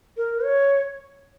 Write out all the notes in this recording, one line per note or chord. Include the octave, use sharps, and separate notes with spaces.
A#4
C#5